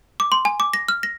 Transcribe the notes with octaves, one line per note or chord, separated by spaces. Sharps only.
D6
C6
G#5
D6
A#6
F6
A#6